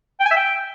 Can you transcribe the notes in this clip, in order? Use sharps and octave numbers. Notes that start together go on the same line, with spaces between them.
G5
G#5
E5
G5